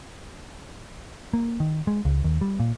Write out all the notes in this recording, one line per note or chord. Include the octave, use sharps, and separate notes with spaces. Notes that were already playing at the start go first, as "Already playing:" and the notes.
A#3
D#3
G#3
C#2
D#2
G3
A#2